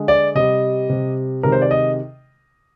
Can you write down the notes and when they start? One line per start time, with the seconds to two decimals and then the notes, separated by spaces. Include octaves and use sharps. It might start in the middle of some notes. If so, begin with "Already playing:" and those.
Already playing: D3 G#3
0.08 D5
0.35 C3 G3 D#5
0.89 C3 G3
1.43 C3 D#3 G#3 A#4
1.52 C5
1.62 D5
1.71 D#5